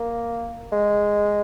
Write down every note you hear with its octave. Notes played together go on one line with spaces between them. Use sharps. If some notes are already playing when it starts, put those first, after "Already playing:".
Already playing: A#3
G#3